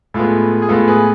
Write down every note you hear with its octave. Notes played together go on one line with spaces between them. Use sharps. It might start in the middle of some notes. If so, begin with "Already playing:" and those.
A2 G#3 B3 F4 A4
G#4
A2 G#3 B3 F4 A4
G#4 B4